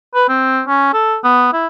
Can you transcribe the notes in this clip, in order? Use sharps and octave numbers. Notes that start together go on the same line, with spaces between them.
B4
C4
C#4
A4
B3
E4